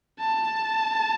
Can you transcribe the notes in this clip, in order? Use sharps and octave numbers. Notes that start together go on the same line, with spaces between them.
A5